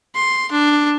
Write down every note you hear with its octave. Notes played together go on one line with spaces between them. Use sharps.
C6
D4